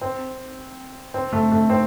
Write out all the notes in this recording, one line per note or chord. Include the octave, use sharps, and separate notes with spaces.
C4
C4
A3
A3
C4